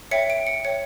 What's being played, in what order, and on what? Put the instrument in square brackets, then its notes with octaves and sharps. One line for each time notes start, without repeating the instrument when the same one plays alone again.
[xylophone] C#5 E5 G5 C#7
D7
C#7
C#5 E5 G5 C#7